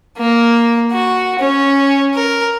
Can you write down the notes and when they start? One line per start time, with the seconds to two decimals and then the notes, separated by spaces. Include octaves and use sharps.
0.18 A#3
0.92 F#4
1.40 C#4
2.14 A#4